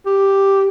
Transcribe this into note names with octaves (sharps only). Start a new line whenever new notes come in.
G4